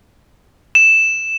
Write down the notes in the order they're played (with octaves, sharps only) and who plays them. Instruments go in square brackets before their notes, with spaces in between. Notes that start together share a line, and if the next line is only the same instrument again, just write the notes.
[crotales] E7